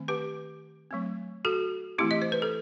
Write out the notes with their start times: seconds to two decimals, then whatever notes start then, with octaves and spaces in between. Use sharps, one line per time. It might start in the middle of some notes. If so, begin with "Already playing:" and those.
Already playing: D#3 A3 C4
0.08 G4 B4
0.91 F#3 A3 C4
1.45 F#4 A4
1.98 E3 A3 C4 E4 G4
2.11 D#5
2.22 C5
2.32 B4
2.42 A4